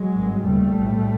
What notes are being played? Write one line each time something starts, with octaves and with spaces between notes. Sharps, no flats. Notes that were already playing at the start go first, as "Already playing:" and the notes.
Already playing: F#3 G#3
G#1 G2
F1 D#2 C#3 G3 A3
B1 A2